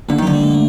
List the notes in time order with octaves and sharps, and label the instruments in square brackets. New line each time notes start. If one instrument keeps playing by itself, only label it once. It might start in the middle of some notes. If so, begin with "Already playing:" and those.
[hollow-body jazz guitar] D3 [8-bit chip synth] A#3
[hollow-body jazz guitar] D#3
[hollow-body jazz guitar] D3 [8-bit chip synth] F#3
[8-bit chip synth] G3
G#3
A3